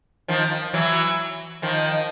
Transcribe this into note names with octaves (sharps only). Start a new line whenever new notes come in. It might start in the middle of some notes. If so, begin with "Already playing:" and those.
D#3 F3
E3 F#3
D#3 F3